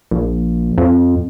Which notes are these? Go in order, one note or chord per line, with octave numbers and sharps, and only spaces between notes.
A#1
F2